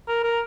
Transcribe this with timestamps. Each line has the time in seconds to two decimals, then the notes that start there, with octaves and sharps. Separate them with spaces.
0.08 A#4
0.23 A#4